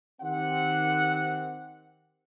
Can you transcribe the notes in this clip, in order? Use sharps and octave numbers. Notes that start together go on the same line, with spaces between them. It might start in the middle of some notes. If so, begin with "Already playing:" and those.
D#3 C4 G4 F#5